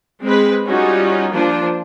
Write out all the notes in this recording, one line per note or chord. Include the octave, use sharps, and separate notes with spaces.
G#3 C4 B4
G3 C#4 D#4 F4 F#4
F3 A#3 D4 F4 C5